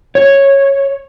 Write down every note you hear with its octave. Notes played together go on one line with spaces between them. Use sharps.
C#5